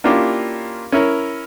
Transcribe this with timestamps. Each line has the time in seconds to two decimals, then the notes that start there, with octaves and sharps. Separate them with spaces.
0.04 A#3 C#4 D4 E4 F4 G4
0.92 C#4 E4 A#4 C#5